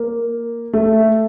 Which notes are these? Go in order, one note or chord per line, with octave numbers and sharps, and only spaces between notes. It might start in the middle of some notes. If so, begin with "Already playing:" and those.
Already playing: A#3
A3